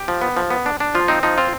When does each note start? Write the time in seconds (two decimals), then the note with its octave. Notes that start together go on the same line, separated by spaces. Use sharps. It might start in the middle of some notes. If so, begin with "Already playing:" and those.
Already playing: G4
0.08 F3
0.21 B3
0.37 F3
0.50 B3
0.66 D4
0.80 D4
0.95 F3 F4
1.08 C4 D#4
1.23 F3 D#4
1.38 C4 F4